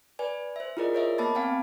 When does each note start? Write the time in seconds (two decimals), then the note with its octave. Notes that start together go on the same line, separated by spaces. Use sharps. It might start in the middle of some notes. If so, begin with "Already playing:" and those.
0.19 B4 D5 G#5
0.56 C5 E5
0.77 E4 F4 G#4 A#4 D5 D#5
0.93 A#4 C#5 D#5 E5
1.18 A#3 B3 A5 B5 D6 A6
1.35 C4 F5 G5 G#5